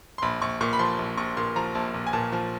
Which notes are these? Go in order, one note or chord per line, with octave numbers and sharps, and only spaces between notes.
C6
A#1 B5
A#1 C#6
A#2 C#6
B5
F3 C6
A#1
A#1 C#6
A#2 C6
F3 A#5
A#1 A5
A#1
G#5
A#2 A5
F3